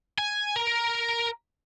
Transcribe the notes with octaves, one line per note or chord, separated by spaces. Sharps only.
G#5
A#4